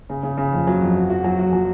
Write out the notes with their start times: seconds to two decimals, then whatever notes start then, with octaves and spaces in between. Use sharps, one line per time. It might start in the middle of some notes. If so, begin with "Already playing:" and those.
0.10 C#3
0.23 C#3
0.37 C#3
0.53 F2
0.67 F#3
0.82 F2
0.95 F#4
1.10 F#4
1.24 F#3
1.39 F#4
1.53 F#3